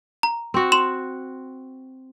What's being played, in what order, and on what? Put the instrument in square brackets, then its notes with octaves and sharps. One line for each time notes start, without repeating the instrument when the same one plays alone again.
[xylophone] A#5
[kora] C4 F#4
[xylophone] C6 E7